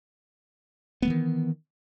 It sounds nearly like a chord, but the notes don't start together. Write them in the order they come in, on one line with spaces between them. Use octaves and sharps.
B3 A3 E3 D#3